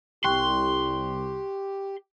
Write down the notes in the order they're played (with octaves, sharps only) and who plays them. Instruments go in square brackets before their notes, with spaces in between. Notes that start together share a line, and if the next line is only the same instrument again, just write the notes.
[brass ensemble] C2 [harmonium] G4 [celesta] G5 C#6 F#6 [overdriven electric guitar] C6